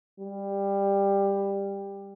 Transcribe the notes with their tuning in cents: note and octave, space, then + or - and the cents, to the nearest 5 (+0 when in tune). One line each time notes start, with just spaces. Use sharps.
G3 +15